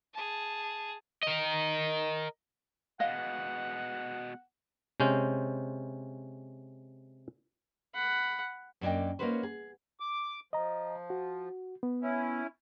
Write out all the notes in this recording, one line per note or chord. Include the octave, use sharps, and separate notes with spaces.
G#4 A5
A#4 D#5
B2 G#3 D#5 F5 F#5
C3 G#3 C#4 C5
F#5 B5
F#2 A#3 D4 D5 D#5 G5
A#3 C#4 D#4 F#4 B4 C5
G#4
D6
F3 D#5 A#5
F#4
B3
C#4 E4